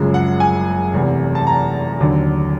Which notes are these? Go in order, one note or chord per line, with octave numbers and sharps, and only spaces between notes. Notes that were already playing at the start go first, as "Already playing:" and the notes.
Already playing: F#1 F#2 C#3 F3 G#3
F#5
G#5
F1 E2 C3 E3
A5
A#5
D#2 D3 F#3